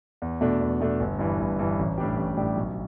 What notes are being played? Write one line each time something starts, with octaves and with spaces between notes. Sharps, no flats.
E2
B2 A3 D4
E2
B2 A3 D4
G1
G2 E3
G1
G2 E3
A1
A2 G3 D4 G4
A1
A2 G3 D4 G4
B1